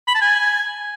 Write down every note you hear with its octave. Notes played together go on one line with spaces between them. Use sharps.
B5
A5
G#5